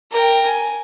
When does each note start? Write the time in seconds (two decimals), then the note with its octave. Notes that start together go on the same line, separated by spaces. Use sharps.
0.11 A#4 G5
0.46 G#5